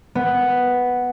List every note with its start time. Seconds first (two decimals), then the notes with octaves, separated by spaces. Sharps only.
0.15 B3